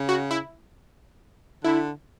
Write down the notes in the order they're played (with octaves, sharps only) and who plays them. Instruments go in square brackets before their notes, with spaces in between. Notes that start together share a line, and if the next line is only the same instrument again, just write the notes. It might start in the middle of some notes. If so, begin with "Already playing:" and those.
Already playing: [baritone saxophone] C#3
[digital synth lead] F#4
E4
[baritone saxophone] D3 [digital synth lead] E4